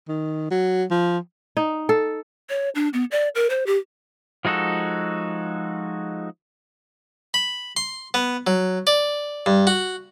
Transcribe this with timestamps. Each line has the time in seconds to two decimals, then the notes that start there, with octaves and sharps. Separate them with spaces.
0.08 D#3
0.51 F#3
0.91 F3
1.57 D#4
1.89 A4
2.49 C#5
2.75 D4
2.94 B3
3.11 D5
3.35 A#4
3.50 C5
3.66 G4
4.45 F3 G#3 D#4 F#4 A4
7.34 B5
7.77 C6
8.14 B3
8.47 F#3
8.87 D5
9.46 G2
9.67 F#4